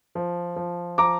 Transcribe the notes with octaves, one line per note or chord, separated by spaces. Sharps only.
F3
F3
F3 A#5 D6